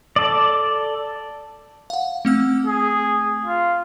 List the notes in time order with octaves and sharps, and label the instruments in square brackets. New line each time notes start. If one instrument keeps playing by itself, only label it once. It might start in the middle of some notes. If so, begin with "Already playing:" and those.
[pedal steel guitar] A4 D5
[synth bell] F5 F#5
A3 C4 E6
[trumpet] G#4
F4